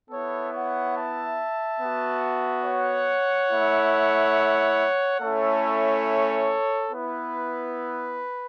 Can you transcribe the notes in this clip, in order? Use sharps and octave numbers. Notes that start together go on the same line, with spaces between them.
B3 E4 A4 C#5
C#5 F#5
E5 A5
B3 F#4
C#5 F#5
A3 E4
A3 C#4 E4 A4 C#5
B3 E4 B4